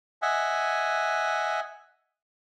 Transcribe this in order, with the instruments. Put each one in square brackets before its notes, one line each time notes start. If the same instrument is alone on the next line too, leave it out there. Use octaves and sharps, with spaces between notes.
[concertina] D#5 E5 F#5 G#5